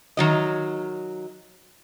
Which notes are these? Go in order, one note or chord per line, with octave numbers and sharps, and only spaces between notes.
D#3 F#3 D#5